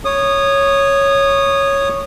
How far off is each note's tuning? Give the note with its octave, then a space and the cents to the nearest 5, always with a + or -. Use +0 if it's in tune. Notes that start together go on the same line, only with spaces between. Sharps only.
C#5 +0 D#6 -20